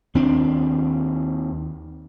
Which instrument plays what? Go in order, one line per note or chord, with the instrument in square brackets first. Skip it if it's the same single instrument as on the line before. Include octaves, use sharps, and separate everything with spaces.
[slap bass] D#2 C4 D4